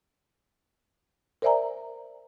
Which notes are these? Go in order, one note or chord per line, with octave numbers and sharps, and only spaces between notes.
A#4 C5 D5 E5 G#5 A#5